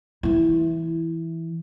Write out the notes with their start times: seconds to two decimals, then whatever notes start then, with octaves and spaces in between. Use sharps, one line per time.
0.23 E3 E4